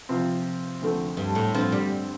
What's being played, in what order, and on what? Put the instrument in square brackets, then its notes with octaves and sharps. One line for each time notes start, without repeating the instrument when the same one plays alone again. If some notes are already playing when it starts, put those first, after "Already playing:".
[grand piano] C3 F3 C4 F4
D2 D3 F3 A3 C4
[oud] G2
A2
[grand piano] G2 D3 A3 C4 [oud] F3
[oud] G3